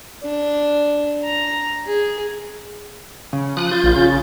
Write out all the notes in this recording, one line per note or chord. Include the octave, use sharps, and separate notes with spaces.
D4
A#5
G#4
C#3
F3 D#6 F#6
F4 G6 A6
A#1
C#3